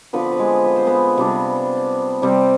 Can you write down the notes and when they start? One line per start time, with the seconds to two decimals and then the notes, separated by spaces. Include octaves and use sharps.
0.13 D3 F3 B3 C4 B4
0.32 B4
0.39 G#3 G#4
0.66 B4
0.76 C5
0.87 B3 B4
1.17 C3 G3 D4
2.22 C3 G3 C4